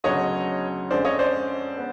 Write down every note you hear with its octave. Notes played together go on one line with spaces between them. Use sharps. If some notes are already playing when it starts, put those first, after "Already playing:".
D2 C#3 F#3 B3 D4 C#5 D#5
F2 D3 F3 G#3 C#4 C5 D5
C#5 D#5
C5 D5
B3